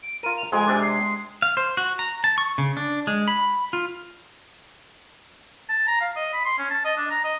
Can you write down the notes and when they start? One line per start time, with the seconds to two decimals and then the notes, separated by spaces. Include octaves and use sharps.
0.03 D7
0.23 F4 A#4 D#7
0.38 F7
0.52 F2 G#3 G#5
0.67 C3 D4
0.82 C7
1.42 F5
1.57 C5
1.77 F#4
1.99 A#5
2.24 A5
2.38 C#6
2.58 C#3
2.77 D4
3.07 G#3
3.28 B5
3.73 F4
5.69 A5
5.88 A#5
6.01 F5
6.16 D#5
6.33 B5
6.45 C6
6.58 C#4
6.71 A5
6.85 D#5
6.97 D4
7.11 A#5
7.24 D#5